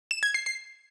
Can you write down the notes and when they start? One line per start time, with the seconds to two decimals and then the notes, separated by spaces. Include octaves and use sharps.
0.11 E7
0.23 G#6
0.34 C7
0.46 C7